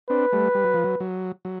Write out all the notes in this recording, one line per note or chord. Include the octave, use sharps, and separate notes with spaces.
C4 D4 B4
G3 A3
G3
F#3
F3
F#3
F#3
F#3